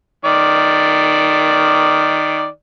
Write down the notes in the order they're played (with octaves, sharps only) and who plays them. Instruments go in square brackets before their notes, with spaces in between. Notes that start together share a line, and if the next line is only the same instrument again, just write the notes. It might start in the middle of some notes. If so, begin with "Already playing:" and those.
[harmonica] D#3 D5